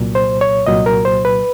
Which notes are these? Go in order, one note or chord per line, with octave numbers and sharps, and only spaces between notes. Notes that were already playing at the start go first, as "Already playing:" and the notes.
Already playing: C2 A#2 F#3
C5
C#5
C2 A#2 F#3 D#5
A#4
C5
B4